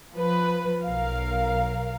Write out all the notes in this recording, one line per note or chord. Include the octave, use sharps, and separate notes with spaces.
F3 B4
B1 A#4 F5